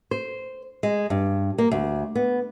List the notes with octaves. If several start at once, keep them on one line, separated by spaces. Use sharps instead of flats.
C5
G#3
G2
A#3
D2
B3